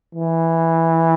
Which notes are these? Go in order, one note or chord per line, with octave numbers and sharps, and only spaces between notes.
E3